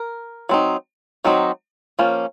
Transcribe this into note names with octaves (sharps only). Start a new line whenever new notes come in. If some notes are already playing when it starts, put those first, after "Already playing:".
Already playing: A#4
F#3 C4 D#4
D#3 F#3 C4 D#4
F3 A#3 C#4